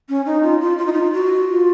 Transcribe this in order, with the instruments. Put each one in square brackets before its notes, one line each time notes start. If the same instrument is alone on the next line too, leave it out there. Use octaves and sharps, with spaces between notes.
[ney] C#4
D#4
F4
F4
F4
D#4
F4
F#4
F4